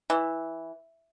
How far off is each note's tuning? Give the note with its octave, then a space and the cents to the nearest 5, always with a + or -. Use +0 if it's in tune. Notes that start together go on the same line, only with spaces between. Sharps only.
E3 -5